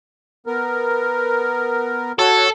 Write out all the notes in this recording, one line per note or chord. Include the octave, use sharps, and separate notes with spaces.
B3 A#4
F#4 A4 C#5